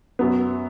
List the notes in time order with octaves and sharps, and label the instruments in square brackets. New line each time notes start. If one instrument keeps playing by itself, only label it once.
[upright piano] F#2 F#3 B3